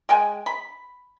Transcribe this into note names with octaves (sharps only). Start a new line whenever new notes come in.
G#3 G5 G#5
B5